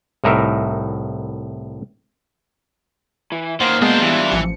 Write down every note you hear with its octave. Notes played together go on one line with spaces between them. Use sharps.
C2 A2 D#4 A#4 E5
E3
B1 D#3 A#3 C5 F#5
B2 G#3 A#3 B3 D4 F4 G#4 C5
E3 G3 E4
A1 F3 C#7